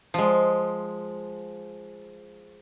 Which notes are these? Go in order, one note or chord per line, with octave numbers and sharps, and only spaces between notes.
F3 G#3